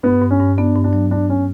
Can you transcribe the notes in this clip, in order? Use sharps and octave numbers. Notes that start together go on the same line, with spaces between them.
G2 B3
G2
C#4
G2
B3 D4
G2
D4
F#3
G2 D4
C#4